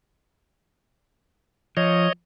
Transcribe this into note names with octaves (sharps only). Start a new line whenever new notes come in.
F3 C#5 D#5